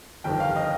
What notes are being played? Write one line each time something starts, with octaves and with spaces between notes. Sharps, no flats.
G1 F2 C3 D#3 G5
F5
D#5